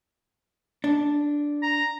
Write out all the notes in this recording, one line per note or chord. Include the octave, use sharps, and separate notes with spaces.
D4
A#5